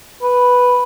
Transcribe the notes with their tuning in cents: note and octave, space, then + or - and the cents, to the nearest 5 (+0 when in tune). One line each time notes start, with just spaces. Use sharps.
B4 +0